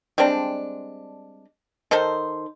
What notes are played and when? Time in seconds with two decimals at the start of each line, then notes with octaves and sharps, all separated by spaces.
0.18 G3 G#3 C4 D4
1.91 D#3 D#4 A4 C5